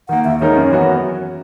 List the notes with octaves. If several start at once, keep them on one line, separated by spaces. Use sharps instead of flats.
D#3 A#3 F#5
D#2 E5
D#3 G#3 D#4 A#4 C#5
F#2
E3 B3 F#4 A#4